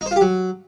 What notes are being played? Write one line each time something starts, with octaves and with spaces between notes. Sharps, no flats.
D#4
C5
F4
G4
F#3